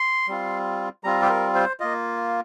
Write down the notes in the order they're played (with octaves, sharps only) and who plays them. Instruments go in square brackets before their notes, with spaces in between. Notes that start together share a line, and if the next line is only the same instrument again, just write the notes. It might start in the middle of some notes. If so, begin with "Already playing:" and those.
Already playing: [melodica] C6
G3 C4 F4
G3 C4 F4 A#5
G4
A#4
C5
A#3 F4 D#5